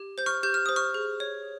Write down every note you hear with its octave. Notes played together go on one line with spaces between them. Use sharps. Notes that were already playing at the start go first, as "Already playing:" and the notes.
Already playing: G4
C5 G6
C#6 F6
G4 G6
F6
C5 D#6
C#6 F6
G#4
C#5